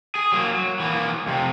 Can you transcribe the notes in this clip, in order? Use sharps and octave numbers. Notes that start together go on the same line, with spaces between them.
G#4
F#3 A#3
F#3
E3 A#3
F2 C3